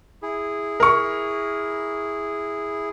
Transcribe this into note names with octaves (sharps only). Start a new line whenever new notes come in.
E4 G#4
A#4 C#6